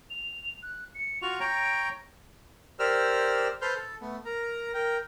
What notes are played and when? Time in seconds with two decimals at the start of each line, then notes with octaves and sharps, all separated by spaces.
0.10 F7
0.63 F#6
0.95 C#7
1.22 F4 F#4 C#6 F7
1.40 C#5 G5 A#5 D7
2.79 G4 A#4 C5 D5 E6 F6
3.62 A4 B4 C5 C6 F6 G6
3.76 A4
4.01 A3 B3
4.25 A#4 A#5
4.74 A#4 G5